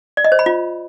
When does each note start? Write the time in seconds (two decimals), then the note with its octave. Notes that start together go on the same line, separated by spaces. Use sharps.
0.17 D5
0.24 D#5
0.32 C5
0.39 B5
0.46 F4